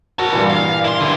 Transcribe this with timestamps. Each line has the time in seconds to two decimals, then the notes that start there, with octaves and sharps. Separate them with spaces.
0.19 F#4 A#4 A5
0.33 G2 A#2 E3
0.50 F5
0.84 E4 C6
1.01 D3 E4